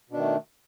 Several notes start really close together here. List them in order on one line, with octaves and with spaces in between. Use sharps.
B2 D4 D#3 A3